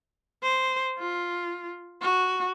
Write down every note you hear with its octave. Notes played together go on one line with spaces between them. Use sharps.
C5
F4
F#4